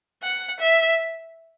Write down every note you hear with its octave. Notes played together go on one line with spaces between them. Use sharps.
F#5
E5